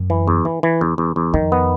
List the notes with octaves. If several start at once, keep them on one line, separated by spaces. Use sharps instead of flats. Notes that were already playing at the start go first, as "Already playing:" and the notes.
Already playing: F#2
E3
E2
E3
E3
E2
E2
E2
F2 D#3
B3